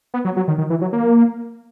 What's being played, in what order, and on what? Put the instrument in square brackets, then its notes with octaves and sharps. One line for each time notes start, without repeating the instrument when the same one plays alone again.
[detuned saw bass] B3
F#3
F#3
D#3
D#3
E3
F#3
A#3